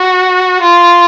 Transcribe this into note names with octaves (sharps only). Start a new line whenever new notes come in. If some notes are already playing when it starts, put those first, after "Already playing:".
Already playing: F#4
F4